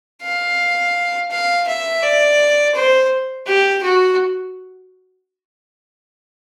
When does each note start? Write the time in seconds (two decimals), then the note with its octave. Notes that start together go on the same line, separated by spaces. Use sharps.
0.22 F5
1.31 F5
1.67 E5
2.03 D5
2.75 C5
3.46 G4
3.83 F#4